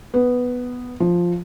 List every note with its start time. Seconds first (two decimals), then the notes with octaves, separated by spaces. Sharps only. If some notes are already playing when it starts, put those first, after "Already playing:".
0.14 B3
1.00 F3